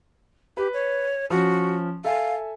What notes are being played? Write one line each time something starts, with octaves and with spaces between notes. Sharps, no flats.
G4 B4
C#5
F3 C#4 F#4
A4 E5 F5 G#5